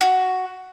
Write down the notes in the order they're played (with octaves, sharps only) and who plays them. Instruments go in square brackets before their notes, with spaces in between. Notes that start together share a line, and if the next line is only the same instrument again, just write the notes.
[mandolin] F#4